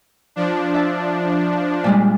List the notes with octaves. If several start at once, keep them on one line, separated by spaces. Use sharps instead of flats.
F3 D4
E5 A5
A#2 G3 G#3